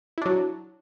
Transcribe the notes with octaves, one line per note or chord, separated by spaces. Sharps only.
F#3 D4 E4